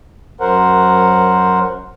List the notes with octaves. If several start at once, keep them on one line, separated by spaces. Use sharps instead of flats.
F#2 F#3 A#4 C5 F#5